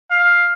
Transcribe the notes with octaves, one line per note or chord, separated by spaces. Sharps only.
F5